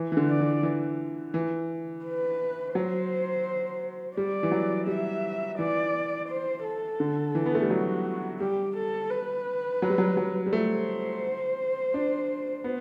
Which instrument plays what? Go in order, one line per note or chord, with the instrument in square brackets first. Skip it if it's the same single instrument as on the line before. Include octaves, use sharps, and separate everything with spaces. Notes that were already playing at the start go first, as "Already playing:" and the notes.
Already playing: [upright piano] E3
E3
D3
[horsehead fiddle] D5
[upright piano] E3
E3
E3
[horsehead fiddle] B4
[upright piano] F#3 [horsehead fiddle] C5
[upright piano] G3 [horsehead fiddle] D5
[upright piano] E3
F#3
[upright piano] G3 [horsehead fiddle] E5
[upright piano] E3 [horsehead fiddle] D5
[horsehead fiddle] C5
A4
[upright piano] D3
E3
B3
A3
G3
[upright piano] F#3 [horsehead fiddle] F#4
[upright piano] G3 [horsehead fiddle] G4
[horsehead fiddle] A4
B4
[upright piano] F#3
G3
F#3
F#3
G3
[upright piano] A3 [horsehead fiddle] C5
[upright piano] D4
B3